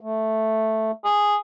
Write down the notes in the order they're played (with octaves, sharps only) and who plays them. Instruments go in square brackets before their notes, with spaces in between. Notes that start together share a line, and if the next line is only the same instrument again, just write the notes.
[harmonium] A3
[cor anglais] G#4